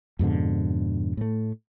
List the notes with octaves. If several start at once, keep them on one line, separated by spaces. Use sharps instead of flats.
F2 G#2 B2 D3
A2 A3